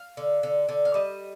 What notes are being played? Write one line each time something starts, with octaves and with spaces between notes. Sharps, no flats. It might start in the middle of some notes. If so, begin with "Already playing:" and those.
Already playing: F5
D3
D3
D3
F5
G3 D#5